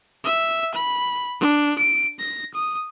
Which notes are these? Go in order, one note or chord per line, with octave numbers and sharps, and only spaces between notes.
E5
B5
D4
D7
A#6
D#6